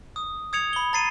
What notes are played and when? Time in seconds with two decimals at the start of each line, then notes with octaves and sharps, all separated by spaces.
0.16 D#6
0.53 D#6 G#6 C#7 F7
0.73 B5 G7
0.93 A#5 A6 C7 D#7